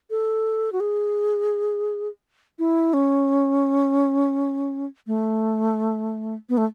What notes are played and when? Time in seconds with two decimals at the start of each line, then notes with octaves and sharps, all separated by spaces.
0.10 A4
0.72 F#4
0.80 G#4
2.59 E4
2.94 C#4
5.07 A3
6.49 B3
6.57 A3